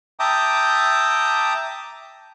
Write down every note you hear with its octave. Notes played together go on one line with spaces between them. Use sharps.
E5 G5 A5 A#5 D6 D#6